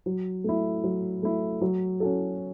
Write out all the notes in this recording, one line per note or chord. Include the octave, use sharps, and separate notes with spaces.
F#3
A3 E4
F#3
A3 E4
F#3
C#4 F#4 A4